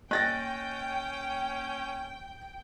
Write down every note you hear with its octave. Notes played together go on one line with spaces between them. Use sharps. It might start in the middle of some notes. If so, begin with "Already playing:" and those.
A#3 C#4 G5 F#6 A6 A#6